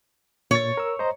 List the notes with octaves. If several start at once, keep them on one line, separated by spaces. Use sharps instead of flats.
A#2 C#5 A6
A#4 E6
C5 D#5 A#5